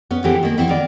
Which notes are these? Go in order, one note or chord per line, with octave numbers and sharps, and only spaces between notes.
B3 C#4
D3 E3 B3 C4 G4 G#4
D#3 A#3
E3 B3 C4 D4 E4
D#3 D5